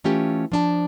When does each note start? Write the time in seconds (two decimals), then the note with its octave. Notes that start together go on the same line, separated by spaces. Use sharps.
0.04 E3 A3 C#4 F4 G4
0.52 F3 D4 A5